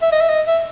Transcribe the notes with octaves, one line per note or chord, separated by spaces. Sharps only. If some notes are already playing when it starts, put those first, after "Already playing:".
E5
D#5
E5
D#5
E5